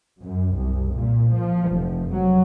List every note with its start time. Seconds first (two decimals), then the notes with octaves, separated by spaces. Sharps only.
0.21 F#2
0.54 C2
0.93 A#2
1.32 F3
1.70 F1
2.12 F#3